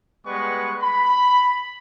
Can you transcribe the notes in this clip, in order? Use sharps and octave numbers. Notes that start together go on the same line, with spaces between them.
G3 G#3 B3 B4 C#6
B5